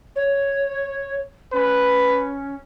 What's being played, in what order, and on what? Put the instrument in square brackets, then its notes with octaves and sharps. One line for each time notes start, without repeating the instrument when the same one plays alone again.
[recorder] C#5
[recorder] C#4 [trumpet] B4